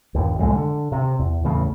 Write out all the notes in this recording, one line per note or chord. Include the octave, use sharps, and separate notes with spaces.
G1 D#2
C2 F2 A2 G#3
D3
C3
E2
A1 E2 C#3 A3